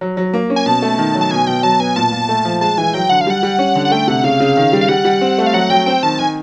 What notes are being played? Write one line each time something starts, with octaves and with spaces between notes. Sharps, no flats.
F#3
F#3
A#3
C#4
G#5
B2 A5
A3
D#3
F#3
A5
B2 G#5
B2 G5
F#3 A5
B3 G#5
A#2 A5
A#2
A3
F3
G#3 A5
E3 G#5
F#3 G5
D3 F#5
F5
G3 F#5
G3
C#4
D3
F#5
A3 G5
C3 F#5
C#3 F5
C#3
D#3
G3
F5
G3 F#5
G3
C4
A3
F5
F#3 F#5
F#3 G5
C4 G5
D#3 A5
D#3 G#5